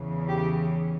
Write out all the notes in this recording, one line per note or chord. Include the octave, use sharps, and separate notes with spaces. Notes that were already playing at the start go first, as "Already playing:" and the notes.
Already playing: E2 C#3 E3
G4